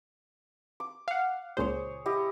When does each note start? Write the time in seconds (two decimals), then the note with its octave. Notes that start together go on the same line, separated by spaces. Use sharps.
0.80 D6
1.08 F5 F#5
1.57 C#2 A#2 G#4 C5 C#5
2.06 E4 G4 D#5